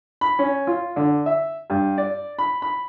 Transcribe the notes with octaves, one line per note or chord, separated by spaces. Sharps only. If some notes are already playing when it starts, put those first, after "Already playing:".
B5
C#4
F4
D3
E5
G2
D5
B5
B5